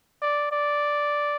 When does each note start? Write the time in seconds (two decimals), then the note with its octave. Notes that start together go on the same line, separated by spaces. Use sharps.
0.21 D5
0.51 D5